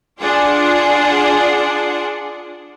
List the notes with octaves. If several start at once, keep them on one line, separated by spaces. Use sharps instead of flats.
D4 F4 G#4 D5 F#5 C6